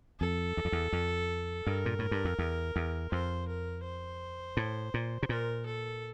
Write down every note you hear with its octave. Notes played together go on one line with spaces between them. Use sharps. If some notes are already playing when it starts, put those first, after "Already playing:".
F2 A4
E2
F2
E2
F2
G2 A#4
A#2
A2
G2
F2
E2
E2
F2 C5
A#4
C5
A2
A#2
C3
A#2 A#4
A4